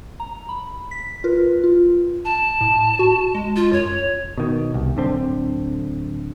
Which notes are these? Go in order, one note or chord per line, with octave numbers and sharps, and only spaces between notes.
A#5
B5
B6
F4 A#4 B4
F4
A5
A2
F#4
G#3
F4
F#2 C#5
B2 D#3
C2
D1 D3 C4